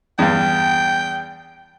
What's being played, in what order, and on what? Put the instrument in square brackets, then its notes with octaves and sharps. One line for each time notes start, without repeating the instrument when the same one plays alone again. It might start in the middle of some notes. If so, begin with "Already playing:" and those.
[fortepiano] E2 G2 [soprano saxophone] G5